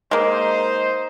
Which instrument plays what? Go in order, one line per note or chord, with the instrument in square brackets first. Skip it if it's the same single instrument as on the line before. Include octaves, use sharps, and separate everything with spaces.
[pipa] G#3 A#3 [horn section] D#4 C5